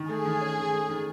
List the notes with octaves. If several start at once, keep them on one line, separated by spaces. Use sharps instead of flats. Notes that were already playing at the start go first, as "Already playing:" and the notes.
Already playing: D#3
A3 G#4
D#3
C#4
D#3
A3
D#3